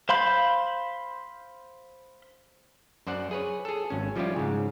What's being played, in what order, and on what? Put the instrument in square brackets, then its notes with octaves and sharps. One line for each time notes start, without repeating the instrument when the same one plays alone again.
[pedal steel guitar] C5 F5 B5 C6 G6
[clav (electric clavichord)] F#2 C5 D5 F#5
G#4 B4 C#5
G#4 A4
G#1 C#4
F3 G3 C#4 E4 F4 G4
G#2 C#3